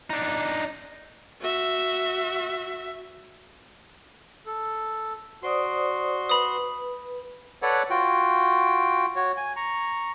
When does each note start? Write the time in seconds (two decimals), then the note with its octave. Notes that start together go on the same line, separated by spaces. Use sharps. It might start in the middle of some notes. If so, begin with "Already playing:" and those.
0.10 D4 D#4
1.41 F#4 E5
4.46 A4
5.43 F#4 C5 D5 C6 D#6
6.29 B4 B5 D#6
7.62 A4 B4 C#5 D5 F#5
7.90 F4 F#4 G5
9.16 F#4 C#5
9.37 G#5
9.56 A#5 C#6